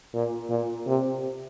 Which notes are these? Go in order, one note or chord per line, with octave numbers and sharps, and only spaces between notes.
A#2
A#2
C3